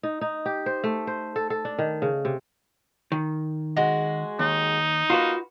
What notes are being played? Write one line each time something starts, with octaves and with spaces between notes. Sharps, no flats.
D#4
D#4
G4
C5
A3
C5
A4
A4
D4
D#3
C#3
C3
D#3
G#3 F#4
D#2 D#4
A#3 F4 F#4 B4